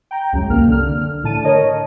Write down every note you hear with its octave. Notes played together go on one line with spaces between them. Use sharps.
G5 A#5
C#2 F#2
C2 A#3 F6
D3 F6
A2 D3 A5 D#7
A#4 C#5 D#5